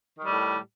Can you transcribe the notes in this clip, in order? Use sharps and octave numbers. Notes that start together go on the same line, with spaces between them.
A2 D#3 G3